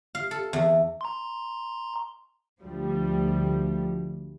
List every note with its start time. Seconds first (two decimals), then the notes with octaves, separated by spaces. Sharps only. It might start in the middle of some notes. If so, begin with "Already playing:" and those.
0.15 F5
0.31 A4
0.53 E2
1.01 A#5 C6
2.62 D2 F3 G3